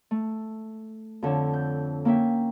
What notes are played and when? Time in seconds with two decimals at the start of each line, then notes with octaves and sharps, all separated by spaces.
0.11 A3
1.22 F2 D3 C#5 A5
1.54 G6
2.05 A#3 C#4 E5 G5